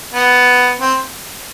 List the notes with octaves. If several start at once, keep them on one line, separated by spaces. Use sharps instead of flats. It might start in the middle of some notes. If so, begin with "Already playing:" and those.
B3
C4